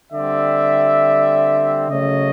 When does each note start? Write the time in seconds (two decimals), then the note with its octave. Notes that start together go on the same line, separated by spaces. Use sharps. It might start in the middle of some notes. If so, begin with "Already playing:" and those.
0.12 D3 G3 C4 D5 E5
1.89 C#3 F#3 A3 C#5 D#5